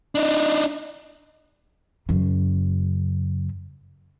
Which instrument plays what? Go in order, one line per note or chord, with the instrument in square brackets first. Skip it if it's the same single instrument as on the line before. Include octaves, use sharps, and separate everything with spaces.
[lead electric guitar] D4 D#4
[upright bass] F#2 C#3